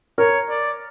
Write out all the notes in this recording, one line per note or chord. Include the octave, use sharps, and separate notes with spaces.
A#4 C#5
D5